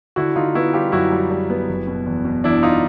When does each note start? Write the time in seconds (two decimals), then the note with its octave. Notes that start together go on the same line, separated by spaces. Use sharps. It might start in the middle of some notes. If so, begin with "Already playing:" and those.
0.16 D3 E4 F#4
0.36 D3 D#4 F4
0.55 B3 E4 F#4
0.73 G3 F4 G4
0.92 F#2 E4 F#4
1.12 G3
1.30 G3
1.50 B3
1.69 F#1
1.87 B2
2.06 E2
2.25 B2
2.44 E2 D4 E4
2.63 D#4 F4